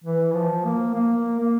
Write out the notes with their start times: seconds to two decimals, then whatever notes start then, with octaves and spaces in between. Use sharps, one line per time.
0.04 E3
0.34 F3
0.65 A#3
0.94 A#3
1.40 A#3